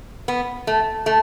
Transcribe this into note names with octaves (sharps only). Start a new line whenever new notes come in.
B3
A3
A3